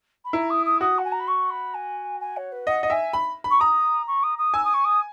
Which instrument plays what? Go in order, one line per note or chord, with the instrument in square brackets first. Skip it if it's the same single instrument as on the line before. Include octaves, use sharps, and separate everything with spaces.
[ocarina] B5
[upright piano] E4 [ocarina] A#5
[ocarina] D#6
D#6
[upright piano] F#4 [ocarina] D#6
[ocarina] F#5
G#5
A#5
B5
C#6
B5
G#5
G#5
C#5
B4
[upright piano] D#5 [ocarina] F#5
[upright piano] D#5
[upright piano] E5 [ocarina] G#5
[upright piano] B5
B5
[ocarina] C#6
[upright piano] A#5 [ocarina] D#6
[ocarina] C#6
D#6
D#6
[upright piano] G#5 [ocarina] E6
[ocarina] D#6
C#6
D#6